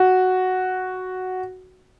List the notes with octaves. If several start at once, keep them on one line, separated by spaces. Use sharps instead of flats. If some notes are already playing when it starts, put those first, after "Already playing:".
Already playing: F#4